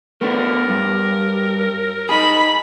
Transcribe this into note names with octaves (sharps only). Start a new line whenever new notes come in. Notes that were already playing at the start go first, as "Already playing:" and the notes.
A3 B3 D4 A#4
G2
D#4 G#4 B5